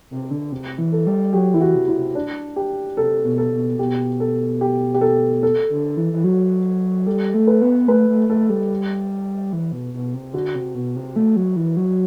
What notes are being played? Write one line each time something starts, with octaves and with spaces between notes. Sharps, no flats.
C3
D3
C3
E3
A4
G3
F#3 G4
E3 E4
F#4
C3
E4
C3
D4
G4
C3 A4
B2
A4
B2
B2 G4
A4
G4
G4
A4
A4
D3
E3
E3
F#3
G3 A4
A3
B4
B3
A3 B4
A3
A3 A4
G3
E3
B2
B2
C3
D3 F#4
C3
B2
C3
A3
F#3
E3
F#3